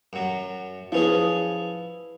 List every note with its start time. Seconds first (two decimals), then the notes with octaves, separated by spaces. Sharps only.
0.13 F#2 F#3
0.92 F3 C#4 E4 G#4 B4